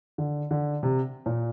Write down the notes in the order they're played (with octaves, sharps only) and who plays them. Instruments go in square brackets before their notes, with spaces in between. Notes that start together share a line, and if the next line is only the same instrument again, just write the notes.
[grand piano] D3
D3
C3
A#2